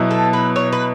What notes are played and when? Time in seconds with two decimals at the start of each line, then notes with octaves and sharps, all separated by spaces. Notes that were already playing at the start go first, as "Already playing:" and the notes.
Already playing: B2 F#3 B3 E4
0.11 A4
0.33 B4
0.56 C#5
0.73 B4